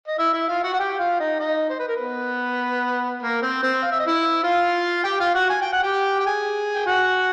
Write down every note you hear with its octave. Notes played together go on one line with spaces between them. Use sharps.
D#5
E4 E5
E4 E5
F4 F5
F#4 F#5
F#5
G4 G5
F4 F5
D#4 D#5
D#4 D#5
C5
B4
A#4
B3 B4
A#3 A#4
C4 C5
C4 C5
F5
E5
D#5
E4 E5
F4 F5
G4 G5
F4 F5
F#4 F#5
G#5
G5
F#5
G4 G5
G5
G#4 G#5
G5
F#4 F#5